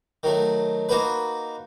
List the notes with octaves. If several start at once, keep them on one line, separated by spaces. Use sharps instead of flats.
D#3 F#3 A3
A#3 D#4 F#4 B4